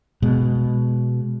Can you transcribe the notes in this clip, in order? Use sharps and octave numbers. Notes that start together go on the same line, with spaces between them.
B2 G#3